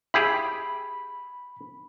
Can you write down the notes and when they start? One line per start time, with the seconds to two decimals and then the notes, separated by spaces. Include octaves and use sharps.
0.14 E4 G4 G#4 B5